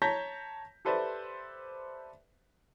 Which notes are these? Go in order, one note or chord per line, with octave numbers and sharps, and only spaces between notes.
C#5 A5 A#5 G6 A#6 B6
G4 A4 B4 C5 D5 E5